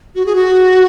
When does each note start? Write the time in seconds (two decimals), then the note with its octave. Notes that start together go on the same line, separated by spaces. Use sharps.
0.15 F#4
0.26 G#4
0.35 F#4